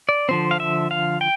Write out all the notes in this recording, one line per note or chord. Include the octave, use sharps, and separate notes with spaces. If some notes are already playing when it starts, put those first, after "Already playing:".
D5
D3 F3 C4 C5
F5
E5
F5
G5